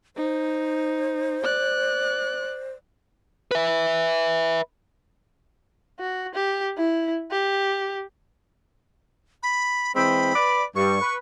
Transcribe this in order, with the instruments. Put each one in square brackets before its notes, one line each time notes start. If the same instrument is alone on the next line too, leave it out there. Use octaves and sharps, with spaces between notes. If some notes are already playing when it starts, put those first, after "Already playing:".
[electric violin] D#4 [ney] C5
[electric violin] D5 F#6
[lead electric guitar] B4 E5
[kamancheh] F#4
G4
E4
G4
[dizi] B5
[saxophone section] E3 G#3 C4 [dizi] B5
[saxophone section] B4 D5
[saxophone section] G2 [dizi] C#6
[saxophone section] B4